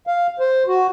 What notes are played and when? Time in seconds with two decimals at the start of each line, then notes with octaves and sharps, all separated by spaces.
0.07 F5
0.39 C5
0.67 F#4